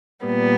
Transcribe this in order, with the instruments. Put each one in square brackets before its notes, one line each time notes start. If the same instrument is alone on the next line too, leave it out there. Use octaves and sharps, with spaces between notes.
[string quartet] A#2 G3 B3